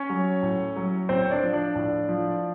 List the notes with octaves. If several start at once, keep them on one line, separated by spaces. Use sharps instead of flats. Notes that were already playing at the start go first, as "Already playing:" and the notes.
Already playing: C#4 C#5
F#3
A2
F#3
A2 C4 C5
C#5
D4 D5
F3
D4 D5
A2
F3